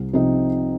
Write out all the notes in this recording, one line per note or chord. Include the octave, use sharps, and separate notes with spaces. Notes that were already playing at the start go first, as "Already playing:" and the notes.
Already playing: C2
C3 F3 C4 D#4